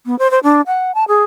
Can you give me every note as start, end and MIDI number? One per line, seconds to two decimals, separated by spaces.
0.06 0.18 59
0.19 0.30 72
0.31 0.39 72
0.43 0.61 62
0.67 0.92 78
0.95 1.04 81
1.08 1.24 68